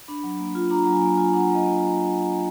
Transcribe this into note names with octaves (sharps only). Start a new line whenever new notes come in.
D4 B5
F#3
A#3
F4
D4 A#5
F#3 A#5
G#5
A#3
G#5
F4
D4 F#5
F#3 D#5
A#3